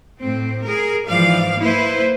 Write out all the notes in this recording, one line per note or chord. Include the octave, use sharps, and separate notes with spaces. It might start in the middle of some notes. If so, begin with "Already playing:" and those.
A2 C4
G#4 A#4
G#2 E3 F3 D5 F5
A#3 E4 B4 C5